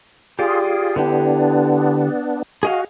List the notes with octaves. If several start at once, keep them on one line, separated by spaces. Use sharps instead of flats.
F4 G4 G#4 D5
D3 B3 D4 E4 G4
F#4 G#4 D#5 F5